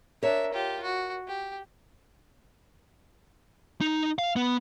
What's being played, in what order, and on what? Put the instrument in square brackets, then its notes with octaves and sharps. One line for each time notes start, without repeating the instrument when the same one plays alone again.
[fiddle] D4 E5 [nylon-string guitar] A#4 C#5
[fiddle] F4 G4
F#4
G4
[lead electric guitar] D#4
F5
B3